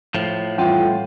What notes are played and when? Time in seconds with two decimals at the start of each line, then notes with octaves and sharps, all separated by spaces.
0.14 A2 F3
0.58 E3 G3 A3 F4 F#5 G5 C6